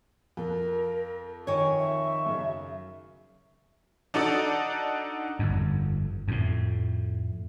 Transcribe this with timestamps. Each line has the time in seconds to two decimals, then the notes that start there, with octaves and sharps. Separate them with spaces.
0.37 F2 A#4
1.47 D#3 C#5 G#5 C#6
1.78 E5
2.26 F#2 C#3
4.14 D4 D#4 F#4 A4 D5
5.39 G1 F2
6.28 F2 A2